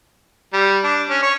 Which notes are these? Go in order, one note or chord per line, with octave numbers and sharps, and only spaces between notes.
G3
D4
C#4
C#5